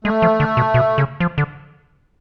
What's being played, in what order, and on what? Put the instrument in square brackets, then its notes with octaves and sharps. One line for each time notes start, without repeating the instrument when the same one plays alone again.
[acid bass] G#3 [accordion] A3
[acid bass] F3
D3
B2
B2
C#3
F3
D3